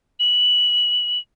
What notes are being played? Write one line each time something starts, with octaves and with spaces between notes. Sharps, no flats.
F#7